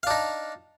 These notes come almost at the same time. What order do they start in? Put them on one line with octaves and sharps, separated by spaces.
F5 D4 D#4